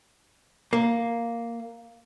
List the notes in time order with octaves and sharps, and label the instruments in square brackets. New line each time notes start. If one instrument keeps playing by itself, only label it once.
[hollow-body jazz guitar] A#3